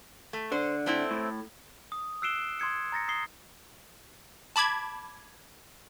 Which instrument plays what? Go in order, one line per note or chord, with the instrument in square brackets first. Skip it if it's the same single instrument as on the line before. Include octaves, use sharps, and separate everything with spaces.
[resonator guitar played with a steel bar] A3
[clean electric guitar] D3 [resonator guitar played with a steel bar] C5
[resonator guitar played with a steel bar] A3 C4 E4
[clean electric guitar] A2
[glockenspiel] D#6
E6 F#6 C7 D7 E7 G7
C6 D#6 G#6 C#7
A#5 A6 A#6 C#7
D#6 C7 G7
[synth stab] A5 B5 D6 G#6